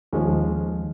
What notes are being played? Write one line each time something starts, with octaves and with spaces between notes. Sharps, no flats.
D#2 F3 G#3 C#4